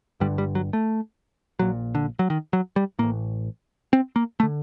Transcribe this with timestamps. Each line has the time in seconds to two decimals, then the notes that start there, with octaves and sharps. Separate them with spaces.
0.20 G1 G2 D3 G3
0.38 G3
0.55 F#3
0.73 A3
1.59 A#1 A#2 F#3
1.95 D3
2.19 F#3
2.30 D#3
2.53 F#3
2.76 G3
2.99 A1 A2 A#3
3.93 C4
4.16 A#3
4.40 A3
4.43 D3